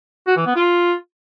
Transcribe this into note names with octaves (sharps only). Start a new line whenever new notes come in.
F#4
E3
B3
F4